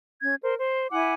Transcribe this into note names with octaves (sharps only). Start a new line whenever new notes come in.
C#4 G#6
A#4 C5
C5
E4 F#5 G#5 D6